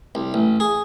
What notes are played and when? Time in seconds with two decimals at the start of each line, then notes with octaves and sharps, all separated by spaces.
0.15 C2
0.34 A1
0.60 G#4